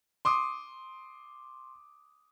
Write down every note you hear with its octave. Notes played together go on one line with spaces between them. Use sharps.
C6 D6 D#6